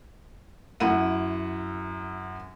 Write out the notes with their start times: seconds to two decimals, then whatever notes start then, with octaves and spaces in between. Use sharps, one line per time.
0.80 F#2 E4 F#5 D#7